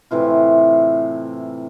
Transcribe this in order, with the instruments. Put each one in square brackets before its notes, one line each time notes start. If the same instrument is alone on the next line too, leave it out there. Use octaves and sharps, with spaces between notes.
[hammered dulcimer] A2 C3 E3 F4